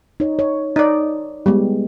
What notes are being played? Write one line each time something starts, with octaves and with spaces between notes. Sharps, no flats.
D#4 C#5
C#5
D#4 D5
G3 G#3 B3 G4